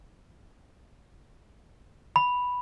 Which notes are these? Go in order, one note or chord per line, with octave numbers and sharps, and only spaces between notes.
B5